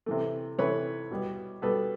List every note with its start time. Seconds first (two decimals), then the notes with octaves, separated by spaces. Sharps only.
0.06 C3 E3 A3
0.58 C3 E3 A3 B4 C#5
1.11 B2 G3 B3
1.62 B2 G3 B3 A4 B4